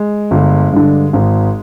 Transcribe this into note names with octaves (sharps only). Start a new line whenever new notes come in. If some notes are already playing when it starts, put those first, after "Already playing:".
Already playing: G#3
G1
G2 D3
G#1